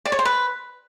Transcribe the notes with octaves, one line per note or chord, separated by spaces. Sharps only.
D5
C#5
C5
B4